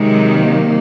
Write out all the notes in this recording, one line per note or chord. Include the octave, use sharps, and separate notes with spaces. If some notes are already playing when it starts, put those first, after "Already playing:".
Already playing: C3 D#3 F#3 G#3
A#3